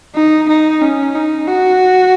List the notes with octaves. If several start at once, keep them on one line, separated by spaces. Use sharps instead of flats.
D#4
D#4
C#4
D#4
F#4